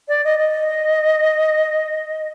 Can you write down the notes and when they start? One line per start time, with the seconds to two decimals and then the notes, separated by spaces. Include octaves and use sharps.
0.08 D5
0.24 D#5
0.39 D#5